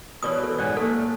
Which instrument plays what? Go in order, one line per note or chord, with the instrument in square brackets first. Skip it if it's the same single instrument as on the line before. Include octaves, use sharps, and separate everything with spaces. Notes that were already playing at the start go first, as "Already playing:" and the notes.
[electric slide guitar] B2 E3 [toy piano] C#5 D5 D#6
[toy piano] A4
[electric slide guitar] G#2 F#5 G#5 [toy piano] D5
[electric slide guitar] A3 A#3 [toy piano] A4